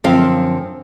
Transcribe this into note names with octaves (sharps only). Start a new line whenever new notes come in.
F#2 D3 F3 C4 F5